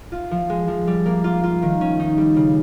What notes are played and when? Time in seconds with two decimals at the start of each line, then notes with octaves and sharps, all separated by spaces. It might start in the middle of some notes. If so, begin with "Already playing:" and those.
0.12 F4
0.31 F3
0.50 G#3
0.68 F3
0.87 G3
1.06 A#3
1.24 F4
1.43 F4
1.62 D#3
1.81 C#4
2.00 D#4
2.18 G3
2.36 C#3